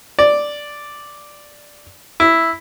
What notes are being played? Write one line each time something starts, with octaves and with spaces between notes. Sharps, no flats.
D5
E4